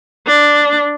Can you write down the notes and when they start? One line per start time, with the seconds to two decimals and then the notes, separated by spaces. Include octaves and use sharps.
0.27 D4